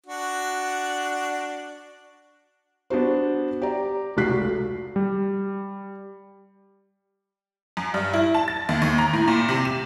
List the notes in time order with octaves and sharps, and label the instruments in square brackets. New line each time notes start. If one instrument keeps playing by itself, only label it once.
[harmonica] D4 F#4
[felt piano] B3 D4 F#4 C5
G4 D5 A#5
F1 C#2 F#4 F#6 B6 C7
[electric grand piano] G3
[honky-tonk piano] F#2
G2
E4
A5
A6
D#2
D#2
A#5
A2
A#2
C3
E7